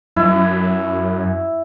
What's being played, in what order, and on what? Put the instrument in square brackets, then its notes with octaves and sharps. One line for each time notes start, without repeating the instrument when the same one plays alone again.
[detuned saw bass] F#2 [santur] E4